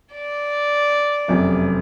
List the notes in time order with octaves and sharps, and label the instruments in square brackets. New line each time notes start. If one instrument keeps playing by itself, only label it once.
[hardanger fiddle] D5
[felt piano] F1 F#2 C3